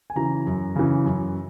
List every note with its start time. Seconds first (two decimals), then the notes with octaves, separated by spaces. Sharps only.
0.10 G#5
0.16 C#3 E3 A#5
0.47 F#2
0.76 C#3 E3
1.06 F#2